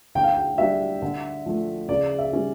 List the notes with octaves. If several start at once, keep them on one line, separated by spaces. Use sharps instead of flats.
D3 G5
F5
G5
G3 D4 E5
D3
F3 A3
C#3 D5
E5
G3 C#4